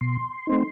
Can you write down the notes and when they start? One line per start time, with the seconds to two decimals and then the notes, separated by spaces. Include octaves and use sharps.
0.01 B2 C6
0.47 A3 C4 D#4